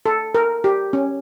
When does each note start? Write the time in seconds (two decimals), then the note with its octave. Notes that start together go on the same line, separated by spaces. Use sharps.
0.06 A4
0.35 A#4
0.64 G4
0.93 C#4